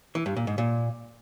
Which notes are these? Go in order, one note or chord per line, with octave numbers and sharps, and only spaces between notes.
E3
G2
A#2
G#2
A#2